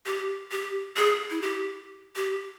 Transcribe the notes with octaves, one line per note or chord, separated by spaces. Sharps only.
G4
G4
G#4
E4
G4
G4